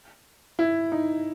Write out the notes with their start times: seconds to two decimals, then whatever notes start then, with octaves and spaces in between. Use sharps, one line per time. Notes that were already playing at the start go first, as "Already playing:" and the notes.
0.59 E4
0.92 D#4